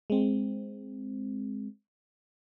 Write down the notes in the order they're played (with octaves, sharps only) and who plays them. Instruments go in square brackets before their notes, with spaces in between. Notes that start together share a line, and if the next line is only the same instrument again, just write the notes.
[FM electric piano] G#3 C4